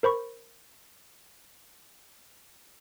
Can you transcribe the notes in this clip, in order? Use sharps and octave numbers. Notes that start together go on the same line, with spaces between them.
A#4 C5 B5 C#6